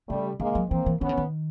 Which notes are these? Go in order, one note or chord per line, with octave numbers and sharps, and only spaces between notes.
C#3 G3 A3
D3 G#3 A#3
F#3
E3 A#3 C4
E3
D#3 B3 C#4
D3
D#3